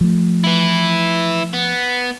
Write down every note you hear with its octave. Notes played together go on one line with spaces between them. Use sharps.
F3 A3
E3 E4
B3